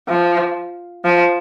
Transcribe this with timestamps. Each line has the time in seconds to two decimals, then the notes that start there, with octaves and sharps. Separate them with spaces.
0.09 F3
1.05 F3